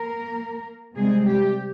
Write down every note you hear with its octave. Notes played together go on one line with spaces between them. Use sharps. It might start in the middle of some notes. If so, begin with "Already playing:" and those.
Already playing: A#3 A#4
C3 G3 G#3 C4 G#4
G3 G4